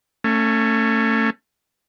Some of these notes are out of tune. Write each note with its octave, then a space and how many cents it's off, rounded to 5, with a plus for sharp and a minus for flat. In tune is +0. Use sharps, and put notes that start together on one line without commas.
A3 +25 C#4 +0